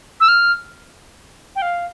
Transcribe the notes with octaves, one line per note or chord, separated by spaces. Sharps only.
E6
F6
G5
F5